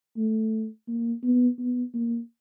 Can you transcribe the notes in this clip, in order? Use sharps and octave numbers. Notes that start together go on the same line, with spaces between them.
A3
A#3
B3
B3
A#3